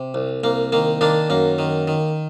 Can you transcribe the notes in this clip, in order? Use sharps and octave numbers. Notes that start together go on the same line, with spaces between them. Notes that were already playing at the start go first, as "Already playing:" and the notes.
Already playing: C3
C2
C2 A#3
D#3 A#3
D#3 A#3 D4
F#2 A#3
D#3
D#3